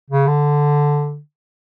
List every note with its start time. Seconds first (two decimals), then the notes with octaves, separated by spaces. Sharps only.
0.10 C#3
0.27 D3